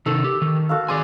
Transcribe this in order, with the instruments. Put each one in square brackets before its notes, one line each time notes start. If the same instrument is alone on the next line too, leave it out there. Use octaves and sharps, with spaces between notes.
[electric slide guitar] C3 D#3 [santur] A4
[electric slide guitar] G4
D#3
[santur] F#4 A4 F5
[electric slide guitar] D#3 G#4 G#5 [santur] D5 C6